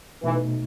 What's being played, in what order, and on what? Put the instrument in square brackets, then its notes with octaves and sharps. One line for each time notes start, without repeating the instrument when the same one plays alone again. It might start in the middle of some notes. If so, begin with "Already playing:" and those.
[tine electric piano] B2 A3 D#4 [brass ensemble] E3